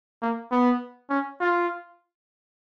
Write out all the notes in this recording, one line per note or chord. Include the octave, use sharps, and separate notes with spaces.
A#3
B3
C#4
F4